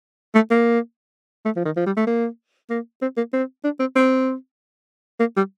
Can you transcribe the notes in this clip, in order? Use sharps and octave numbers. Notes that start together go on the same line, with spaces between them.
A3
A#3
A3
F3
D#3
F3
G3
A3
A#3
A#3
C4
A#3
C4
D4
C4
C4
A#3
G3